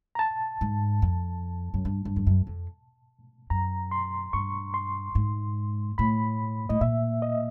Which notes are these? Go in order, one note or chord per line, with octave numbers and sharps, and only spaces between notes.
A#5
A5
G#2
F2
F#2
G2
G2
F2
F#2
F2
F#2 A#5
C6
G2 C#6
C6
G#2
A2 B5
A2 D#5
A#2 E5
D#5